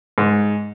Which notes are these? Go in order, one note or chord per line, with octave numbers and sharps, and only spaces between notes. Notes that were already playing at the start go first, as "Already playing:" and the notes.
G#2